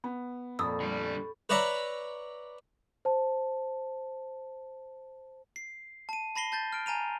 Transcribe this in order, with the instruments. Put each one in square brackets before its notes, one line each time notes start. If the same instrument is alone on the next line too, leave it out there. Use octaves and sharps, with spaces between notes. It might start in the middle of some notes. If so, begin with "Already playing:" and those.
[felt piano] B3
[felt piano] F2 A#2 [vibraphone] A4 B5 C#6 [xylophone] D#6 E6
[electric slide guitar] D3 G3
[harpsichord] B4 C#5 D5 E5 A#5 B5
[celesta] C5 A5
[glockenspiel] C7
A5 D#7
A5 B5 A#6 C7 G7
A5 G6 A6
F6 D7
G#5 A#5 D#7 F7